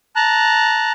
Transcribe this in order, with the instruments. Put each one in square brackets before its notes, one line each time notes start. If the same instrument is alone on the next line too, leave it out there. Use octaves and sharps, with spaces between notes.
[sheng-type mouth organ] A5 A#5 F#6